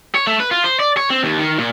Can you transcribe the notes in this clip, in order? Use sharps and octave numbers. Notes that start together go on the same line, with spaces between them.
C#5
A3
B4
F4
C5
D5
C#5
C4
D#2
D#3
A#2